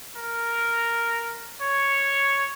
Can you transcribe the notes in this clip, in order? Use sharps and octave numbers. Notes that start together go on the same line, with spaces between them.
A#4
C#5